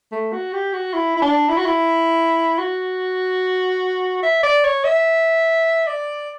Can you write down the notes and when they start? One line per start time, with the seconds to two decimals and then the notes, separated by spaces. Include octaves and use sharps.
0.12 A3
0.33 F#4
0.53 G4
0.73 F#4
0.94 E4
1.16 E4
1.22 D4
1.49 E4
1.57 F#4
1.65 E4
2.59 F#4
4.23 E5
4.43 D5
4.64 C#5
4.85 E5
5.87 D5